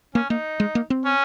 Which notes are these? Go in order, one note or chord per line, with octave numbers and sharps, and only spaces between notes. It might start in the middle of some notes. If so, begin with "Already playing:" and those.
A#3 C#4
A#3 D#4
G#3
A#3
C4
C#4